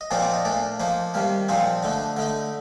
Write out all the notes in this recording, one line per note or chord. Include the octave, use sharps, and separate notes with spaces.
D#5
A#2 F3 C4 D#4 D5
D5
D#5
A#2 A3 D4 D5
F3 A#3 D#4
C3 D#3 G3 A#3
A#2 F3 C4 D#4
D3 A3 D4 D#4
D3 A3 D#4